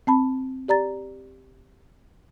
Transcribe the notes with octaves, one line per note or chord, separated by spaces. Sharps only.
C4 A5 B5
G4 D5 A#5 A6